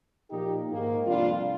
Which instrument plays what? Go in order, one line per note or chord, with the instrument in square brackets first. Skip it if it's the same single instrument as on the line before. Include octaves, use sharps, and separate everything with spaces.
[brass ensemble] A#2 F3 A#3 D#4 G4
G#2 D#3 A#3
F2 C3 G3 A#3 D4 F4